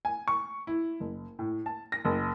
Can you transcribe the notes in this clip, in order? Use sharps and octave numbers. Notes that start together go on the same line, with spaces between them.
G#5
C#6
E4
F#1
A2
A5
A#6
F#1